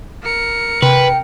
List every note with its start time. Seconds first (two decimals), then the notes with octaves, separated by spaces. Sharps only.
0.23 A#4 C#7
0.82 C3 B4 G5